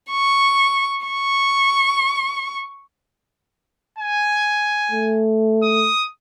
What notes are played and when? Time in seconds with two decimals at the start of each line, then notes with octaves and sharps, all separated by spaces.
0.11 C#6
1.06 C#6
3.98 G#5
4.91 A3
5.63 D#6